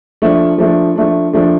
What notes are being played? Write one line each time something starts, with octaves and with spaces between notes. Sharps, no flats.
F3 A3 D4
F3 A3 D4
F3 A3 D4
F3 A3 D4